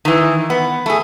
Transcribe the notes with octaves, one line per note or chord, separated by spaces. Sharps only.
D#3 E3
B3
A3 G#4